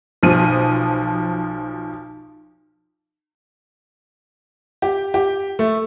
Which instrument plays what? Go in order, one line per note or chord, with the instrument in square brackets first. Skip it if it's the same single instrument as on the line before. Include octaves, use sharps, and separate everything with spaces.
[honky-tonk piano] B1 F3 D#7
[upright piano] G4
G4
A3